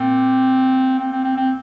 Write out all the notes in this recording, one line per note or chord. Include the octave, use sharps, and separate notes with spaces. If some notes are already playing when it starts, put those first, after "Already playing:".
Already playing: A#2 C4
C4
C4
C4
C4